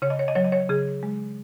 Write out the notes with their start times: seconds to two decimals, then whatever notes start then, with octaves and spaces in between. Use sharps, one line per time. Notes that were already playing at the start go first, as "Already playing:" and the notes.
0.02 C#3 C#5
0.10 D#5
0.19 C#5
0.28 D#5
0.35 F#3 C#5
0.44 D#5
0.52 C#5
0.69 C#3 G#4
1.03 G#3